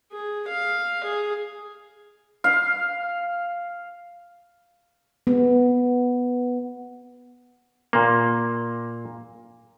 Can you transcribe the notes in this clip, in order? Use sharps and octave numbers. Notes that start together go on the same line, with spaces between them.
G#4
F5
G#4
F5
B3
A#2 A#3